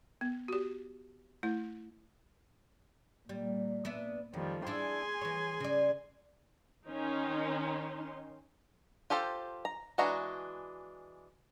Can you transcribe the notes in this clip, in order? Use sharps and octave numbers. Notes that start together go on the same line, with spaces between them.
B3
F#4 G4
A3 E4
A#2 G3
B3 D4 E5
F2 D#3 F3 G3
D4 E4 G#4 G#5 C6
E3 C#5
C#3 D5
D#3 C#4 D#4 C6
F4 G4 A4 C5
A#5
E3 G#3 D4 F#4 A#5